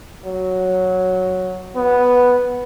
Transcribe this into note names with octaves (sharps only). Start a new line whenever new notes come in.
F#3
B3